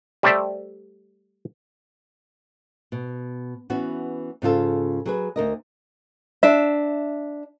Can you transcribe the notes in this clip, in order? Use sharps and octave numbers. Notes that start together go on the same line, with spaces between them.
G3 A3 G4 C5 D5 E5
B2
E3 B3 C#4 F#4
G#2 C#3 F4 A4
F#3 G#4 B4
D2 A#4 D#5
D4 E5